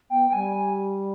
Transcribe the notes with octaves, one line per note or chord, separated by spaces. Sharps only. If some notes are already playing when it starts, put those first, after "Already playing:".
B3 G5
G5
G3 G#5